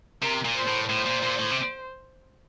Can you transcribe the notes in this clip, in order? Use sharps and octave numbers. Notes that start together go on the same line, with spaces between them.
C3 A#4
A#2
C5
A2
A2 C5
A#2
A#2
A2
C3